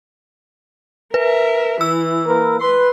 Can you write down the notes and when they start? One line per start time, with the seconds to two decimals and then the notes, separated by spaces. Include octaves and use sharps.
1.14 A#4 B4 E5
1.81 E3 E6
2.27 A#3 A#4 B4
2.60 B4 C6